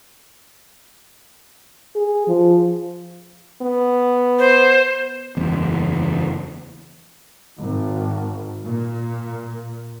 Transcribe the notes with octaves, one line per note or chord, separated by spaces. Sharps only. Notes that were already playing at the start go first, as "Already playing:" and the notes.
G#4
F3
B3
C5
F#1 E2
G#1
A#2